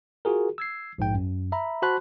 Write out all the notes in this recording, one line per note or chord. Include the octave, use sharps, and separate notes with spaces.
F4 F#4 G#4 A#4
E6 G#6 C7
A#1 G#2 G5
F#2
E5 A#5 B5
F#4 C5 A5 B5 C6 F#6